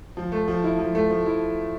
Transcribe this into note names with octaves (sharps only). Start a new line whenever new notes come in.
F3
A3
F3
E4
F3
A3
F3
E4